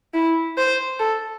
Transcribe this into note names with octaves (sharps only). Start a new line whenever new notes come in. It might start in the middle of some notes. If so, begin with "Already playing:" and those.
E4
C5
A4